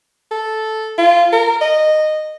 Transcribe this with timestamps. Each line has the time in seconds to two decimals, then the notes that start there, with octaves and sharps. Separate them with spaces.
0.31 A4
0.98 F4
1.32 A#4
1.61 D#5